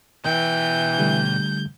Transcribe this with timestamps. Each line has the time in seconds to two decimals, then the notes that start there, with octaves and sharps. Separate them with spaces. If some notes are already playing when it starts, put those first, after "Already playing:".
0.25 B2 E3 G5 G6
0.99 D3 G3 A3